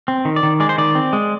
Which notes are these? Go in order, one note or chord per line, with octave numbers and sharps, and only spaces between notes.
C4
D#3
D5
D#3
G#3 D5
C5
D#3 D5
C4
G#3